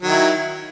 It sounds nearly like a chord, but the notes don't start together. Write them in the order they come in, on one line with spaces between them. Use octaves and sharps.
F#3 D#3 E4